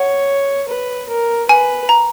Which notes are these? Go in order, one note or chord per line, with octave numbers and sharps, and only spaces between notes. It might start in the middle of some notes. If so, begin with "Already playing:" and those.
Already playing: C#5 F#5
B4
A#4
B4 G#5
A#5